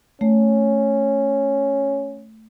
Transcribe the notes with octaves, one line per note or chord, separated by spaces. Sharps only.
A3 C#4